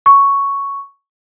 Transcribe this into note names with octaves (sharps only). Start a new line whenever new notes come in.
C#6